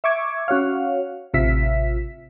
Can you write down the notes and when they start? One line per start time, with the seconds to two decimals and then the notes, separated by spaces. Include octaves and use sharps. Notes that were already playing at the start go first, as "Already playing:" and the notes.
0.04 E5 C#6 D6 G#6
0.48 C#4 F#4 C#5 F5
1.34 A1 C3 F4 E5 B6